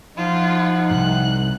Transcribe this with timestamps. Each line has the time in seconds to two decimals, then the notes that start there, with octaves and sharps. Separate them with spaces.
0.18 F3 D#4 F4 F#5
0.90 C2 G#2 F#6